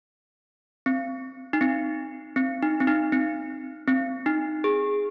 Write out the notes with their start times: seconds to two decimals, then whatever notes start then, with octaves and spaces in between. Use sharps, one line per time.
0.86 C4
1.53 D#4
1.61 C4
2.36 C4
2.63 D#4
2.80 C4
2.87 D#4
3.12 C4
3.88 C4
4.26 D#4
4.64 G#4